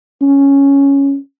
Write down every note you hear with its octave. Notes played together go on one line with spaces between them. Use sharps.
C#4